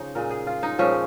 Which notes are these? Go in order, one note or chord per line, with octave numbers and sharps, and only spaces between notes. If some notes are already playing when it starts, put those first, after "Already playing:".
Already playing: C#3 F3 D#4
A#2 G#3 A#4
G#4
F4
D#4
A#2 F3 G#3 C#4